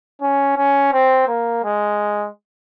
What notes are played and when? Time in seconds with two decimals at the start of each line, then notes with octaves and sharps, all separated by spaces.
0.21 C#4
0.57 C#4
0.93 C4
1.28 A#3
1.64 G#3